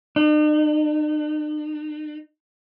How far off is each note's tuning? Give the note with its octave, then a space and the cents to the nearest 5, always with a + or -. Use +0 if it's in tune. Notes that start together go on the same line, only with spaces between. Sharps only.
D#4 -45